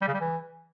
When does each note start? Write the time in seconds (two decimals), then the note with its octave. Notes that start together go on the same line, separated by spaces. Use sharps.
0.01 G3
0.08 C#3
0.14 G3
0.20 E3